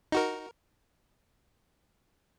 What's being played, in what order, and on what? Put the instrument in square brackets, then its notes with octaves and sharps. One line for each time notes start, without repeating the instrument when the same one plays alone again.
[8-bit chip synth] D#4 F#4 A#4